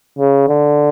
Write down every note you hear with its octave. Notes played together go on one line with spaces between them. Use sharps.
C#3
D3